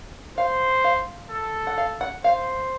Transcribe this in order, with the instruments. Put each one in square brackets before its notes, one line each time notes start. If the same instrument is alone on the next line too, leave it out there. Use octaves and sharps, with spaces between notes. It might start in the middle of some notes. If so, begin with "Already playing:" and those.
[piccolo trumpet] C5 [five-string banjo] F5
[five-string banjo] F5
[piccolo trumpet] A4
[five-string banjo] F#5
F5
F#5
[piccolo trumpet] C5 [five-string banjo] F5